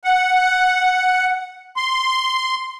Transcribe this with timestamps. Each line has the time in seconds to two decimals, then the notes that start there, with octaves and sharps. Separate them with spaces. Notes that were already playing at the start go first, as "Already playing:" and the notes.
0.04 F#5
1.77 C6